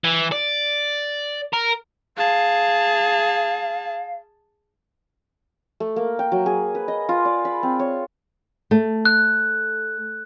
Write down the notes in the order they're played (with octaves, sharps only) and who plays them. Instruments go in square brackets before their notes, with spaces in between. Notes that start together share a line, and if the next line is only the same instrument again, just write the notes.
[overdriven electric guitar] E3
D5
A#4
[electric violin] G#4 A5 [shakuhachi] F5
[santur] A3
A#3
G5
F#3
G#4
B4
D#5
F4
D5
B5
C4
C#5
[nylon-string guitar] A3
[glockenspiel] F#6